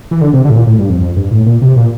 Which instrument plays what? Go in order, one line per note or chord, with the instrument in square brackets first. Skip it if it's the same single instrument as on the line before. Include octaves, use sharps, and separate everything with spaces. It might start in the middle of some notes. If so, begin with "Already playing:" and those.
[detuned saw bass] E3
D3
C3
D3
A2
A#2
A2
G2
F2
F2
G2
A2
A#2
C3
A#2